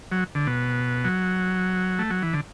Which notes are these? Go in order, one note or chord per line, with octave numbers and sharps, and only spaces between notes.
F#3
D3
B2
F#3
A3
F#3
E3
D3